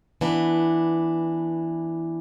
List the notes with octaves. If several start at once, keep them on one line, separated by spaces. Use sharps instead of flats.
E3 B3 D4